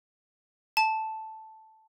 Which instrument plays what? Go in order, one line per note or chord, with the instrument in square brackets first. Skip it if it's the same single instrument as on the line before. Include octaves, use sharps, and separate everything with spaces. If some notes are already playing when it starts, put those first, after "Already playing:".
[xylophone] A5